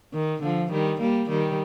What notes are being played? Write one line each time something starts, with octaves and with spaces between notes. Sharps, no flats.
D#3
D3 F3
D#3 G3
G3 A#3
D#3 G3